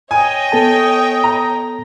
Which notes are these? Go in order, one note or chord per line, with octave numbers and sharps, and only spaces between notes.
C#5 D#5 G5 G#5
B3 A4 A5
A#5